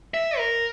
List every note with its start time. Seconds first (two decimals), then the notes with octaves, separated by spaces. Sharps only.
0.14 E5
0.38 A#4